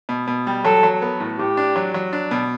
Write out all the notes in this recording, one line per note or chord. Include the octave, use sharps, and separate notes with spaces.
B2
B2
G3
F#3 A4
F#3
B3
A2
A2 G4
D4
F#3
F#3
D4
B2